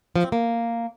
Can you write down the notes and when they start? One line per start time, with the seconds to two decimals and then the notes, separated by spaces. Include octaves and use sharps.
0.16 F3
0.24 C4
0.32 A#3